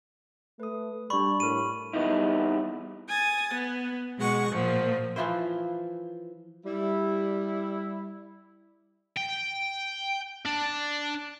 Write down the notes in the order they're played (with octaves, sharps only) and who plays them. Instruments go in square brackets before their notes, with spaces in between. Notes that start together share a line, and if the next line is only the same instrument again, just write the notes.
[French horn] A3 [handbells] B4 D#6
[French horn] G3 [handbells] D4 D5 [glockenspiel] B5 C#6
[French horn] A2 [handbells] G4 A#4 [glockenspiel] D#7
[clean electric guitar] E2 G3 B3 D#4 E4
[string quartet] G#5 D#6 A6
B3
B2 G#3 F#5 C#6
A#2 F3
[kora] E3 F3 E4 C5
[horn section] G3 E4
[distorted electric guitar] G5
D4